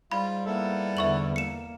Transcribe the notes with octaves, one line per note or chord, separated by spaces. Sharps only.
G#2 G3 F4 B5
A#3 B3 E4 A4
E2 D3 E5 C#6 F#7
A#3 C#7 E7